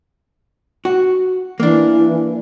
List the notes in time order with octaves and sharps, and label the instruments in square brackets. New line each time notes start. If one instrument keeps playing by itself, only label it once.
[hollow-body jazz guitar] F#4
[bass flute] E3 [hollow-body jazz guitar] A#3 D4